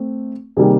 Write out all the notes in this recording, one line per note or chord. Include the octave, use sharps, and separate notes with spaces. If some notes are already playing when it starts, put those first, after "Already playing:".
Already playing: A3 C4
C3 D#3 G3 A#3 G#4